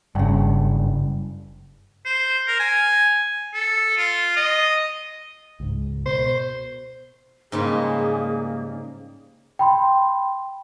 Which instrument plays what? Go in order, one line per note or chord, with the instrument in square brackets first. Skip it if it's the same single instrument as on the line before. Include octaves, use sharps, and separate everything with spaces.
[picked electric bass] F#1 [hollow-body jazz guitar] G2 C#3
[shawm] C5
A#4
G#5
A4
F4
D#5
[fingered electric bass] C#2 G#2
[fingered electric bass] B2 [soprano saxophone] C5
[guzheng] G#2 C#3 G3 [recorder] A#3 [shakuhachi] G#4
[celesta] G5 B5 C6